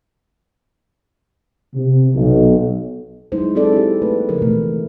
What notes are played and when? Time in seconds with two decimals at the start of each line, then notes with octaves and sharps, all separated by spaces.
1.75 C3
2.15 B1
3.32 F#3 G#3 D#4 E4 C5
3.55 C4 G#4 A4 D5
3.73 E4 G4
4.02 A3 A#3 B4
4.29 C#3 F3 A#4
4.42 B2 E3 A3